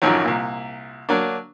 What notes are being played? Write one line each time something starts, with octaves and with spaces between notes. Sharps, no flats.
A1 F#2 D#3 F3 F#3
C2 A#2
F#3 A#3 D4